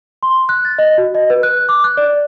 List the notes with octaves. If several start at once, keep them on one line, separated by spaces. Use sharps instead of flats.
C6
F#6
A6
D#5
F#4
D#5
B4
F#6
D6
F#6
D5